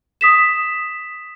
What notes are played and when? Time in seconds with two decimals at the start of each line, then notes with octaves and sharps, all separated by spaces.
0.21 D#6 B6 E7